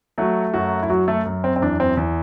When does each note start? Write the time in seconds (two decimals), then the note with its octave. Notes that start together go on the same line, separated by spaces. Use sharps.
0.18 F#3 A3 F#4
0.54 F#2 F#3 F#4
0.82 E4
0.90 F#3 F#4
1.08 A3 A4
1.25 F#2
1.44 C4
1.56 C4
1.62 E2 D4
1.80 C4
1.97 E2